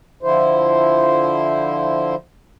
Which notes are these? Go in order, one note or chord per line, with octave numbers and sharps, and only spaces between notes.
D3 F3 E4 C5